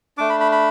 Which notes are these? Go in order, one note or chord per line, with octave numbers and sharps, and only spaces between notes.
A3 D4 D6
B5
B5
B5